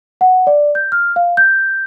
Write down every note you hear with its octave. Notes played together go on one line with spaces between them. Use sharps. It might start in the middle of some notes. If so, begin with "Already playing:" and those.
F#5
D5
G6
F6
F5
G6